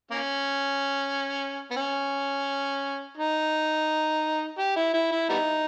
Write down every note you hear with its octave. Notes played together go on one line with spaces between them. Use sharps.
A#3 C#4
B3
C#4
D#4
G4
E4
E4
E4
G3 B3 D#4